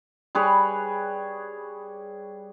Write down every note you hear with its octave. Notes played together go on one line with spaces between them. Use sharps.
G3 G#4 B4 C#5